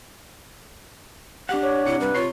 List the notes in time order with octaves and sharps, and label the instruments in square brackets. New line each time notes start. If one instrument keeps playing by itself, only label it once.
[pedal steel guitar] D4 F#5 [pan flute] G4
[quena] C#5
[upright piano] C3 C#7 [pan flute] E4
[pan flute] G3 [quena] B4
[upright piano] C3 C#5 C7 [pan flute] F4